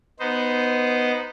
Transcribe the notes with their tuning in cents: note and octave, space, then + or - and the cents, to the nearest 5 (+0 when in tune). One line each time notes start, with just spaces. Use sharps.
B3 +0 D#4 -5 C5 -15